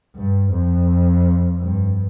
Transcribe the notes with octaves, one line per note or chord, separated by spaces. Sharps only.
G2
F2
G2